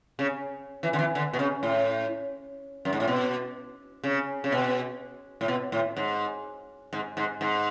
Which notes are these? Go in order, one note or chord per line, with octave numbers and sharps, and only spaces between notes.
C#3
E3
D3
E3
D3
B2
C#3
A2
F#2
G#2
A2
B2
C#3
C#3
B2
A2
B2
A2
G#2
G#2
G#2
G#2